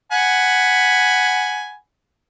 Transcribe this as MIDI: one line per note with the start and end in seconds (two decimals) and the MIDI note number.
0.12 1.76 78
0.12 1.76 80
0.12 1.76 83